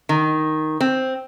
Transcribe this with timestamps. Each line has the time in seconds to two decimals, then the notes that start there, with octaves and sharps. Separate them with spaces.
0.09 D#3
0.81 C4